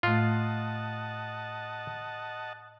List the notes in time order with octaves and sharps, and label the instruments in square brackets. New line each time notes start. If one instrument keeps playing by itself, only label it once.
[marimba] A2 A3 [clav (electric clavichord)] F4 [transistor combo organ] D#5 F#5 A5